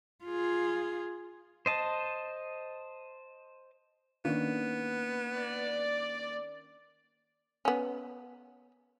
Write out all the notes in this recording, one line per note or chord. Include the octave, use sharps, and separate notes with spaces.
F4 G#4
C5 D#5 A5
D#3 A#3 B3 C#4 D4
D5
B3 C#4